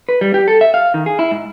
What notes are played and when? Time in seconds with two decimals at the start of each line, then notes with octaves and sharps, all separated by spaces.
0.09 B4
0.21 G3
0.34 G4
0.48 A4
0.61 E5
0.74 F5
0.94 D#3
1.06 G#4
1.19 E4
1.31 G#2